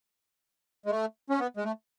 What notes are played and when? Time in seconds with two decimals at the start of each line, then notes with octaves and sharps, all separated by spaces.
0.86 G#3
0.91 A3
1.30 C#4
1.40 B3
1.57 G#3
1.64 A3